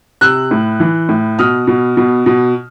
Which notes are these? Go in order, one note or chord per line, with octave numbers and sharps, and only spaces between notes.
C3 E6 F#6
A2
E3
A2
B2 D#6 F6
B2
B2
B2